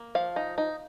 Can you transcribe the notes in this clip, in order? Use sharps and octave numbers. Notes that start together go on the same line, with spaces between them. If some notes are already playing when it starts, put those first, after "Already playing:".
Already playing: A#3
F3 F5
D#4
D#4